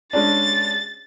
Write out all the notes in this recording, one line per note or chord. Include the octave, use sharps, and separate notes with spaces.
G#3 C#4 D4 A6